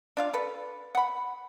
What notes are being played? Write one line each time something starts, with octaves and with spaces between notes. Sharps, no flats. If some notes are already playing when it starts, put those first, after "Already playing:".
D4 F4 F5
A4 B4
F#5 B5